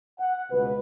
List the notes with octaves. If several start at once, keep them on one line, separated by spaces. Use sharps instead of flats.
F#5
C#2 B2 B4